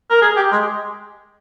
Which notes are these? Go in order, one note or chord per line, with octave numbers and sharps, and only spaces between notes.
A#4
G#4
G4
G#3